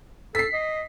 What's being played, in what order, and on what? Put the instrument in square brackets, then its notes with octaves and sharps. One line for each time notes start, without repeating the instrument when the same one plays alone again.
[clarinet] A4 [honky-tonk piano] B6 C7
[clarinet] D#5